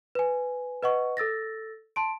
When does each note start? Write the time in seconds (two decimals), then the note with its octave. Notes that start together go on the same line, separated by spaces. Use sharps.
0.15 B4 G#5
0.83 B4 D#5 F#5 C#6
1.17 A4 E6 A6 A#6
1.96 A5 C6 D7